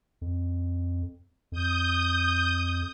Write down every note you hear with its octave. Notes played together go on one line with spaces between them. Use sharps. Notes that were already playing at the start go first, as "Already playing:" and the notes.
F2
F2 D#6 G6